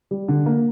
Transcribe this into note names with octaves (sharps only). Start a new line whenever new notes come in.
G3
D3
A#3